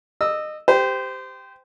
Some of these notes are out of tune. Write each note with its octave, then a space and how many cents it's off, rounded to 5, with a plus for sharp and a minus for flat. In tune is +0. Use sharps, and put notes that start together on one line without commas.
D#5 -25 E6 -10
G4 +5 C5 -25